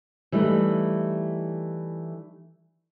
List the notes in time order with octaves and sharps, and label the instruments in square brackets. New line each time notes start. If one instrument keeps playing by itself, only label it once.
[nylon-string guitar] E3 G3 A3 D#4